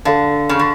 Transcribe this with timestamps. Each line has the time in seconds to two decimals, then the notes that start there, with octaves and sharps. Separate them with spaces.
0.05 D3 A4 D5 F5 A5
0.49 C#3
0.59 D3